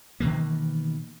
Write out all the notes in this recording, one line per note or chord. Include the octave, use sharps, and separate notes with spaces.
B2 D#3 E3 A#3